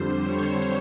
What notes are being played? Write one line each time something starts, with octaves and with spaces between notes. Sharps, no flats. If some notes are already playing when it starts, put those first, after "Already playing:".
Already playing: F2 D3 G3 C5
C#5